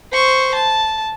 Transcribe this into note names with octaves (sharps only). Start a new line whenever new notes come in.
C5 C#6
A5